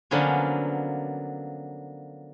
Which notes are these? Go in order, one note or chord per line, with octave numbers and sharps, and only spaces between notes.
D3 F3 F#3 A#3 B3 C#4